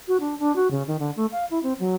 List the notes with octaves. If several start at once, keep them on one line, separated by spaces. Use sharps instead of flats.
F#4
D4
D4
F#4
C#3
D#3
D3
A3
F5
E4
C4
F#3